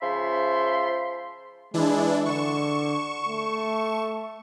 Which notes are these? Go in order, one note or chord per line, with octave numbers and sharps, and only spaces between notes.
C#3 F3 E5 B5 C6
E3 G#3 D4 E4
D3 C#6 E7
A3